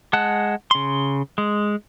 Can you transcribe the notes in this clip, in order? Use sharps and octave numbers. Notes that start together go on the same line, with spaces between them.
G#3 F#5 A5 F#6
C#3 C6
G#3